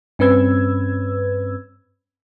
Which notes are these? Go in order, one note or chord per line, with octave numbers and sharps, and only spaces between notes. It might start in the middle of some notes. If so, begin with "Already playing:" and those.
G2 C4 C#4 B4 E6 G#6